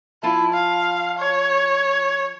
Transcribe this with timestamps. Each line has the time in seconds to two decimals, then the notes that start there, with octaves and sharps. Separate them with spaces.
0.23 F3 E4 F4 A5
0.54 F5
1.19 C#5